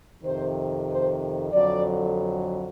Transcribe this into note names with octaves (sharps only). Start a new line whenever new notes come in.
F2 C3 D#3 C5
C5
F2 D3 F#3 D5